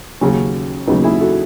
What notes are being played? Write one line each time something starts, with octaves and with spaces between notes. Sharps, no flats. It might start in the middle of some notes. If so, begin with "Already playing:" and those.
D#2 C#3 F#3 C#4
D#2 C#3 F#3 B3 D#4
E4 G#4
F#4 A4